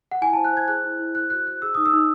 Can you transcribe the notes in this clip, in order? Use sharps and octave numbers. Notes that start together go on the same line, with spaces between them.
F#5
E4 G#5
C5 A5
F#6
C5 G#6
G#4 F#6
E4
E4
C5 F#6
F#4 F#6
C5 F#6
G#4 E6
D#4 D#6
E6
D#4